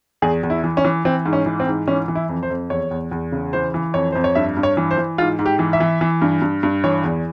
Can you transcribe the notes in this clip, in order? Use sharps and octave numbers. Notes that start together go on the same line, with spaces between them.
E2 G#4
E2
E4
E3
C#4
E3
E3 C4
G#2
C#4
E3
C4
G#2
E3 C#4
E3
E4
F2
C5
F2
E2 C#5
E2
E2
C#3
E3 C5
E3
F2 C#5
F2 C5
C#5
G2 E5
G2
C#5
E3
C5
E3
G#2 F4
G#2
G4
E3
E5
E3
E3
G2
G2
G2
E3 C#5
E2